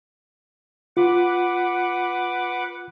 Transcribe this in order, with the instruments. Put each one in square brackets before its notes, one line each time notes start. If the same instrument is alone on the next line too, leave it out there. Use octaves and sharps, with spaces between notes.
[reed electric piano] F4 [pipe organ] B4 F#5 D6